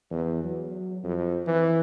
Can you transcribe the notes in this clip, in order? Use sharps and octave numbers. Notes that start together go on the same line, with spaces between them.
E2
F#3
F2
E3